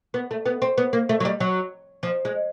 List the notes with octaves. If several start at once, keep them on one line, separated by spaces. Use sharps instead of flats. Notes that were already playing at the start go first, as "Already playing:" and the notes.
B3
A3
B3
C4
B3
A#3
A3
F#3
G3
F#3
F3
G#3